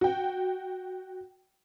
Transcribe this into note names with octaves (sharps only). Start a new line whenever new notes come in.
F#4 G5